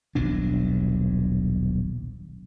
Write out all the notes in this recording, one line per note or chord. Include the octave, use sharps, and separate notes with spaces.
D#1 B1 F#3 D4